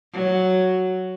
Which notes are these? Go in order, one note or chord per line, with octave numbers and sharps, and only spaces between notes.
F#3